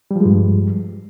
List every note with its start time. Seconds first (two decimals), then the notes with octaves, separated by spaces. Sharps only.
0.11 G3
0.16 F3
0.21 G#3
0.25 G2